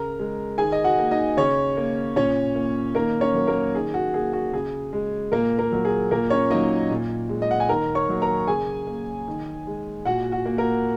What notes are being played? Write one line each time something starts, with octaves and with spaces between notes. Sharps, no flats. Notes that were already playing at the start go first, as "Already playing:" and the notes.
Already playing: C#3 A#4 A#5
G#3
D#3 G#4 G#5
D#5
F#4 F#5
A#3
D#4 D#5
C#3 C#4 C#5
A#3
A#2 C#4 C#5
A#3
D#3 A#3 A#4
C#4 C#5
F#3 A#3
A#3 A#4
D#3 G#4
F#4
A#3 G#4
F#4
C#3 G#4
G#3
A#2 A#3 A#4
A#3 A#4
F#3 A#3
G#4
A#2 A#3 A#4
C#4 C#5
F#3 A#3 D#4 D#5
A#2
G#3
D#5
F#5
G#5
D#3 A#4 A#5
C#5 C#6
F#3 A#3
A#4 A#5
C#3 G#4 G#5
A#3
D#3
G#3
A#2 F#4 F#5
F#4
A#3
A#3 A#4